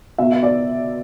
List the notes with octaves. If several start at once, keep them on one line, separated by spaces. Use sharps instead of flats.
B2 B3 E5
E5
D5